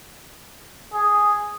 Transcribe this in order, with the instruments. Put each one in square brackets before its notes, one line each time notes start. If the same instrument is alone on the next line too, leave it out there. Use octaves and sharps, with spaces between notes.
[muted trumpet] G#4